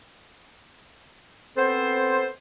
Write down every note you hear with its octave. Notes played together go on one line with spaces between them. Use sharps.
B3 C4 A4 C5